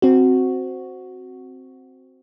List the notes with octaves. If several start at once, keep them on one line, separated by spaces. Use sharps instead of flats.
C4 F#4